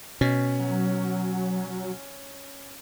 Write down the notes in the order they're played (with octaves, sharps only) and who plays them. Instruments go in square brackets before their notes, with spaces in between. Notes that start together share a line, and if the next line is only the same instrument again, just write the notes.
[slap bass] B2 [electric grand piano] C#4
[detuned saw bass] F#3